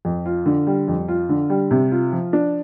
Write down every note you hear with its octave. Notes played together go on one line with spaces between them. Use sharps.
F2
F4
D3
G3
F2
F4
D3
G3
C3
F4
F3
D4